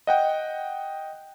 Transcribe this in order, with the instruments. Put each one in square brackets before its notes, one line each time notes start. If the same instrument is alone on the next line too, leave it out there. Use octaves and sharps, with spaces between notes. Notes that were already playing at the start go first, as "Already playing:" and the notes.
[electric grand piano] D#5 F#5 G5